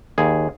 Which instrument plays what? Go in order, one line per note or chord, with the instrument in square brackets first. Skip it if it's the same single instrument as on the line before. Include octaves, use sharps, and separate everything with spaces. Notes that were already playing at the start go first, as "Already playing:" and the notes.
[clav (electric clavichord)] D#2 G#4